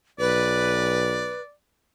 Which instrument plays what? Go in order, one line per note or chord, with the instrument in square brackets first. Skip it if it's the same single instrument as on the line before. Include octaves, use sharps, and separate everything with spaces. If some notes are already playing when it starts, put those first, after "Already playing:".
[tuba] B1 [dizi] B4 [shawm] D5